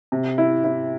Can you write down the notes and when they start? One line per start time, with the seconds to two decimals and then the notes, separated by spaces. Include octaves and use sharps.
0.12 C3
0.38 E4
0.64 E4